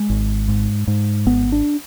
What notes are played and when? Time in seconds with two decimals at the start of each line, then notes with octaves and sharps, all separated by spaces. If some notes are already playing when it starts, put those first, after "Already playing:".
Already playing: G#3
0.10 G#1
0.48 G#2
0.87 G#2
1.26 G#1 B3
1.52 D4